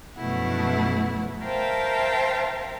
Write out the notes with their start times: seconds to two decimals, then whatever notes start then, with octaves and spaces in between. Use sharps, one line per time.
0.18 F#2 B2 F3 A3 E4 F#5
1.43 A#4 C5 E5 F5 G5 A5